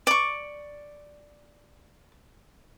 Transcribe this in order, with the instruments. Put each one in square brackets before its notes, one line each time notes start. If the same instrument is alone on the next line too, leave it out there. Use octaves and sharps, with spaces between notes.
[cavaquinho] D5 C#6